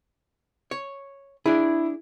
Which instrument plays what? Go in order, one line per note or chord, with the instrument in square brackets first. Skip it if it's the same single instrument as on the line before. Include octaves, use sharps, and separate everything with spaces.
[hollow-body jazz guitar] C#5
[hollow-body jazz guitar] D4 G#4 [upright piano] E4